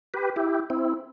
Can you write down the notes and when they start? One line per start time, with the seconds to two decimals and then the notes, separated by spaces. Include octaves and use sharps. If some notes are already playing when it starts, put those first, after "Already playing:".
0.14 G4 B4
0.36 E4 G4
0.70 C4 E4